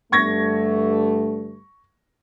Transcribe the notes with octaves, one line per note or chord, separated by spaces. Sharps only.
G2 D3 A3 C#6 G#6 A#6